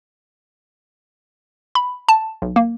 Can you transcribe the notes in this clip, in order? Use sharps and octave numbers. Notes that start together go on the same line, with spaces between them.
B5
A5
B1
A#3